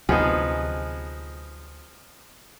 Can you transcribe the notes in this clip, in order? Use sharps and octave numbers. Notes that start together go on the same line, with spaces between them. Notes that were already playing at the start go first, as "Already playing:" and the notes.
D2 C3 F3 F#3 B3 D#4 G#4